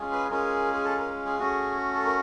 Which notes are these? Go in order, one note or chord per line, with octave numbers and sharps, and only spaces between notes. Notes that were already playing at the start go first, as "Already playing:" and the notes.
Already playing: G#3 C#4 F4 G#4
B4
G#3 C#4 F4 G#4 A#4
G#4
A4
A#4
G#4
A3 C#4 F#4
A4
A#4